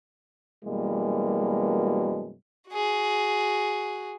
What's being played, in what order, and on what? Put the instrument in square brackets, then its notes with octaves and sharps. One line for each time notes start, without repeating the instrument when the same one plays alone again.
[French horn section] F#2 B2 E3 G3 G#3 A#3
[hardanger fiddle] F#4 G#4